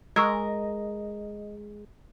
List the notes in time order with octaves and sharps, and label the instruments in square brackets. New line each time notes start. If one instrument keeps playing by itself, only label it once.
[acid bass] G#3 [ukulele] A#4 [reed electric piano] D#5 [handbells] C#6 E6 G#6